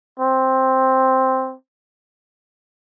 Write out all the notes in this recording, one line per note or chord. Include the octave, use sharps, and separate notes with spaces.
C4